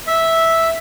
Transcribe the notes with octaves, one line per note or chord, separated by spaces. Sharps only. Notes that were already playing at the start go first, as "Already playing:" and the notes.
E5